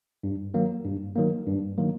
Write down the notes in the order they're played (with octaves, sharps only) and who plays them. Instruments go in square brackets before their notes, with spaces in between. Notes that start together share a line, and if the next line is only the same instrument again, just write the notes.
[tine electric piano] G2
D#3 F#3 A#3
G2
D#3 F#3 A#3
G2
D#3 F#3 A#3